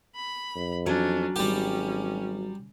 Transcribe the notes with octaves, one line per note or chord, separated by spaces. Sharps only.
B5
F2
F#3 C#4 D4
G#1 G3 C#4 G4